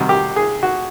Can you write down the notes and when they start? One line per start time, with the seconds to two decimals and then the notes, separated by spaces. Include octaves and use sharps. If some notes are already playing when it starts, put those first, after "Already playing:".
Already playing: C3 D#3 G3 F#4
0.09 G4
0.36 G#4
0.63 F#4